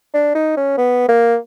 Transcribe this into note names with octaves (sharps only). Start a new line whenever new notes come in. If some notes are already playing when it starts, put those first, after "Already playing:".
D4
D#4
C#4
B3
A#3